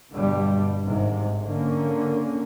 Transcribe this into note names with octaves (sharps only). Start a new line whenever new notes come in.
G2 B2 D3 G3
G#1 G#2 C3
D3 A#3 C#4